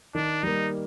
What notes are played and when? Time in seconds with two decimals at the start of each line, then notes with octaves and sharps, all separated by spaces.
0.15 D#3 D4
0.43 G3 A#3 D#4